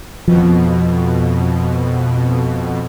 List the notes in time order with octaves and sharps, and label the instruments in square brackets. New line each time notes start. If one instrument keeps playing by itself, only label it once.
[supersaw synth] F2 B2 [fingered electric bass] F3